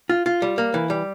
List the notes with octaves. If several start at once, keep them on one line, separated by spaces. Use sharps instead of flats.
F4
F4
G3
A#3
E3
G3